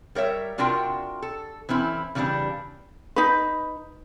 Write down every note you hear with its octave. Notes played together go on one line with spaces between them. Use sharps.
G3 A#4 C#5 E5
C3 D4 F4 F#4 A#4 G5
A4
E3 C4 C#4 E4
C#3 E3 G3 C4 D4
D#4 B4